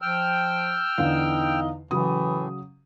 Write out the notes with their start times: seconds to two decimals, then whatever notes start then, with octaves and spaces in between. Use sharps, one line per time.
0.02 F3 G5 E6 F6
0.98 E2 D3 D#4 F5
1.91 A2 C#3 E3 F#3 D#6